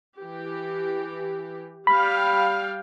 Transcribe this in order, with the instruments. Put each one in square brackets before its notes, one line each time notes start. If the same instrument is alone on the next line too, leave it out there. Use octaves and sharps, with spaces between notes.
[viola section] E3 G4
[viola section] G3 F5 G5 [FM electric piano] B5